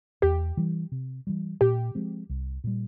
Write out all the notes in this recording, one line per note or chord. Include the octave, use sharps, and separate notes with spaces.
E2 G4
E3 G3
C3
E3 G3
A#2 G4
F3 G#3 C4
C2
A#2 G3